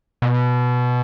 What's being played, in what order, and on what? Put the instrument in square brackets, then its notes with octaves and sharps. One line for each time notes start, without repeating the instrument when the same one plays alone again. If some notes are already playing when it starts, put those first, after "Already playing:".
[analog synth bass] B2